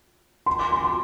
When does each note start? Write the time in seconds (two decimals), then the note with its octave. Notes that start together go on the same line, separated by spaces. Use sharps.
0.46 C6
0.59 D6
0.72 C6
0.84 C6